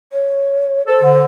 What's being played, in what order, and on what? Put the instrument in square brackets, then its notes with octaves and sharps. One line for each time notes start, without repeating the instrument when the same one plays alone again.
[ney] C#5
[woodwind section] A4 [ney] C5
[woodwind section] D3